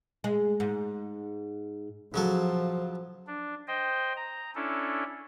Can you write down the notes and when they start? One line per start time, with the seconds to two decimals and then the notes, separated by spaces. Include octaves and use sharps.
0.24 G#3
0.60 G#2
2.14 C#3 F3 F#3 A4
3.27 D4
3.67 C5 D#5 G5
4.17 A#5
4.55 C#4 D4 E4 A4